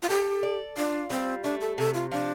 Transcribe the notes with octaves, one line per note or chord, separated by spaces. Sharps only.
F4
G4 A4
D5
D4 F4
G3 C4
A3 D4
A4
C3 A4
F4
F3 D4